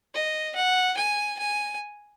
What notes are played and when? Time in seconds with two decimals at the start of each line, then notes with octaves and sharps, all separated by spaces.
0.14 D#5
0.55 F#5
0.97 G#5
1.38 G#5